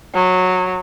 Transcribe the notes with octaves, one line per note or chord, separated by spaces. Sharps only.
F#3